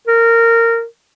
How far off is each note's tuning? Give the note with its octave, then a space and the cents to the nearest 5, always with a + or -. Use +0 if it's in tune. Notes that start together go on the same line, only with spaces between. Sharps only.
A#4 -15